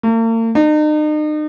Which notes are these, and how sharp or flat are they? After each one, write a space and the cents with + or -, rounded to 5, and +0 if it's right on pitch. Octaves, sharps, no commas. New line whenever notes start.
A#3 -45
D#4 -40